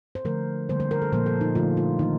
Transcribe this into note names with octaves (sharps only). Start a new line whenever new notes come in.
C5
D3 F3 A3 A#4
D3 G3 A#3 C5
C5
A#4
A4
A#2 F3 A#3 C5
A4
D#4
D3 F3 A3 F4
F4
D#3 A#3 D#4